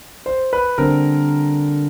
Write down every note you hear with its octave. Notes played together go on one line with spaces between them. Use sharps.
C5
B4
D3 G3 C4 A#4